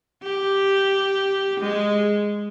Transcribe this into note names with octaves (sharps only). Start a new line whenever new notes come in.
G4
G#3